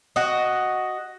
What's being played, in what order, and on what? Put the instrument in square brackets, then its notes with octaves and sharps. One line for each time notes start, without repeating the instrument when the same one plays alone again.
[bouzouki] F#4 D#5